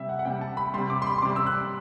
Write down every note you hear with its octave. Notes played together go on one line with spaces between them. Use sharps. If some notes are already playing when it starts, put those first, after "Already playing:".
Already playing: C3 G3 E5
F#5
F#5
C3 G3 G5
A5
B5
C3 G3 C6
D6
C6
B5
C6
C3 G3 D6
E6
F#6